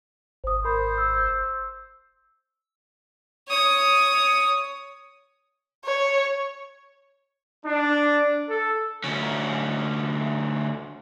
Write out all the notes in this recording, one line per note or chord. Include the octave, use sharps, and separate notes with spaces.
G#1 C5 D#6
A#4 C5 B5
E6
C#5 D#6
C#5
D4
A4
D2 C#4